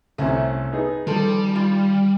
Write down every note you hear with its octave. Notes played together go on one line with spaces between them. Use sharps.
C2 C3 A3 C#4
B3 D#4 G#4
D#3 F3 G3 A4
F4